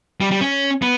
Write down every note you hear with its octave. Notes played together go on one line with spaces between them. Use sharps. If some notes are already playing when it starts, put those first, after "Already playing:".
G3
G3
C#4
B3